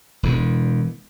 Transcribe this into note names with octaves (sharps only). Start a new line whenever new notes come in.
E1 E2